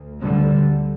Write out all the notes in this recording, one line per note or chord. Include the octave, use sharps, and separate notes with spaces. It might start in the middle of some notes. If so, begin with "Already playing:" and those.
Already playing: D2
D3 G3